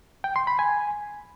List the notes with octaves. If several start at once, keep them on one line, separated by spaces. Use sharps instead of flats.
G5
C6
B5
G#5